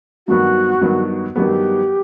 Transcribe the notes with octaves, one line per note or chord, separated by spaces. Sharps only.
G2 D#3 F#3 B3 F#4
G2 D#3 F#3 B3
G2 D#3 F#3 B3 G4 A4